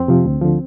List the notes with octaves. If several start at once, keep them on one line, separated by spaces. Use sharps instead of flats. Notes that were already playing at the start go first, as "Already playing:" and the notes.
Already playing: F2 C4
C3 F3
D2
D3 F3